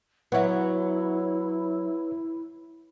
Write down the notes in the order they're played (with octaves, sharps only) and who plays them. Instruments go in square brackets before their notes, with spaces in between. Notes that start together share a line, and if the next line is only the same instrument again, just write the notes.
[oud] F#3 B3 [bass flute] E4 [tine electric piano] B4 C#5 E5